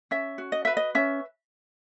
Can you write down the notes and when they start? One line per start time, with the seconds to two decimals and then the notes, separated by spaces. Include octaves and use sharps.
0.11 C#4 E5
0.38 F#4
0.52 D#5
0.65 B4 E5
0.77 D#5
0.95 C#4 E5